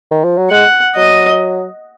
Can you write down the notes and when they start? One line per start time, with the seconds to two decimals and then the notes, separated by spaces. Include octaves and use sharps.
0.11 D#3
0.24 F3
0.37 F#3
0.50 G#3 F#5
0.96 F#3 D#5